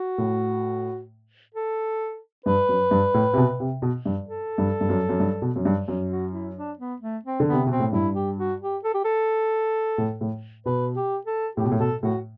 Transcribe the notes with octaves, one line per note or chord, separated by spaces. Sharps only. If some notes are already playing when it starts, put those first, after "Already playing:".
Already playing: F#4
A2
A4
G2 B4
F#2
G2
A2
C3
B2
C3
B2
G2
A4
G2
G2
F#2
F#2
G2
B2
F#2
G2
F#2
F#4
E4
D4
B3
A3
C4
D3
B3
C3
B2 C4
A2
G2 E4
G4
F#4
G4
A4
G4
A4
A2
A2
B2 B4
G4
A4
A2 G4
B2
A2
B2 A4
A2 F#4